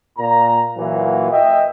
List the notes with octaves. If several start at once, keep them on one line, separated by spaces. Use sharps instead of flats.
A#2 A#5
A#2 E3 F#3
D#5 E5 G5